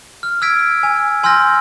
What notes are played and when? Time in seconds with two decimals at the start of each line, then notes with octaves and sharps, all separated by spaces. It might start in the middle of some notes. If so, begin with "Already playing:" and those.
0.23 F6
0.42 E6 F6 G#6 B6 D7
0.83 G#5
1.23 G#5 C6 E6 F6 G6 A#6